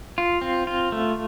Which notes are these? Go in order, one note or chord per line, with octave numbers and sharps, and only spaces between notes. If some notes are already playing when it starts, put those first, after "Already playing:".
F4
C4
F4
A3